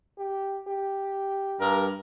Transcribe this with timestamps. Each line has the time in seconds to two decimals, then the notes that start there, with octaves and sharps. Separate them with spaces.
0.18 G4
0.68 G4
1.60 G2 A#4